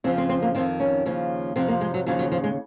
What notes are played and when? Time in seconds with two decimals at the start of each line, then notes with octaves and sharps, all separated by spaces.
0.04 F2 C#3 F3 C4
0.18 C4
0.29 C4
0.42 A#3
0.55 D#3 C4
0.58 F2
0.80 C#4
1.06 D#2 C#3 F3
1.56 F2 C3 F3 C4
1.68 A#3
1.81 G#3
1.94 F#3
2.06 D#2 C#3 F3 F#3
2.19 F#3
2.32 F3
2.44 G#3